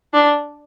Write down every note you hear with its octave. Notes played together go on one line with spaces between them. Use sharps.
D4